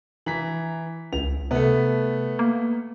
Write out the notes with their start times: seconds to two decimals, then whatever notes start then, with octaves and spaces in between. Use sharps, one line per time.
0.26 E3 A#5 B6
1.13 C#2 F7
1.51 C3 A3 B3
2.39 A#3